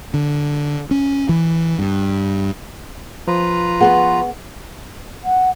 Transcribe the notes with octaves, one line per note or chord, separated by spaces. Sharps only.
D3
C#4
E3
G2
F3 F4 B4 A#5
B3 G#4 F#5 C6 C#6
F#5